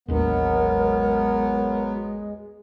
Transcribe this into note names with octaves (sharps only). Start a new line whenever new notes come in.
A1 D#2 F#3 G#3 B3 D4 A#4